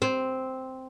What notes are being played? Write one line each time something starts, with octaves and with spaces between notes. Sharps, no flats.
C4